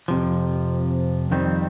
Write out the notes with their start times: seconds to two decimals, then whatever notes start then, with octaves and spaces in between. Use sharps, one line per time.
0.08 F2 C3 F3
1.31 F2 D#3 G3 C4